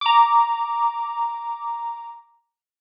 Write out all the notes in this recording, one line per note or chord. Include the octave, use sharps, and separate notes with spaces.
A#5 D6